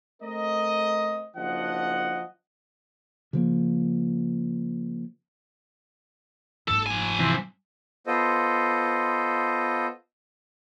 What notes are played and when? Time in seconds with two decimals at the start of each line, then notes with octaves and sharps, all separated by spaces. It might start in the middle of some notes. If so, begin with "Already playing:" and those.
0.23 A3 C4 A#4 D#5
1.36 F#1 F3 D4 D#5 F#5
3.33 C#3 F3 A#3
6.68 F#1 G#2 A4
6.87 F3 G#5
7.19 C3 E3
8.07 B3 F4 A4 C5 D#5